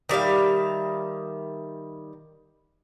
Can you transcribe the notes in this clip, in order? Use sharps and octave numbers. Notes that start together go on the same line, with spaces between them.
D#3 G3 E5 F5